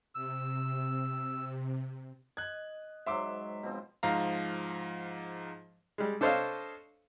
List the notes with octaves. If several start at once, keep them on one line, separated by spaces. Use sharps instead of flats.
C3 E6
D#5 F#6 G#6
G#2 F#3 E5 C6 D6
B2 F3 C4
G#2 F3 F5 A#5
G3 G#3
D4 A4 C5 C#5 D#5 F5